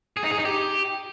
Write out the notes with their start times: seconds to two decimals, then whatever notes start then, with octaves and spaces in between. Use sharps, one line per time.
0.17 G#4
0.24 D#4
0.31 G#4
0.38 D#4
0.45 G4